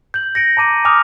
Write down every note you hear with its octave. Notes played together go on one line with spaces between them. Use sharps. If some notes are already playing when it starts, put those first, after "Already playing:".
G6 F#7
A#6 C#7 D7
A5 A#5 D6 D#7
G#5 A5 D6 D#6 F6 F7